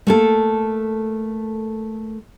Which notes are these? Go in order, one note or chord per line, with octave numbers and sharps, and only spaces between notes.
A3 A#3 A4